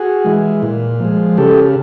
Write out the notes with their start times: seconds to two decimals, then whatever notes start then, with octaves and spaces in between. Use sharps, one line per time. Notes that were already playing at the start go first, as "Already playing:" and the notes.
Already playing: F#4 G#4
0.25 E3 G#3
0.63 A#2
1.00 F3 G#3
1.37 C#3 G4 A4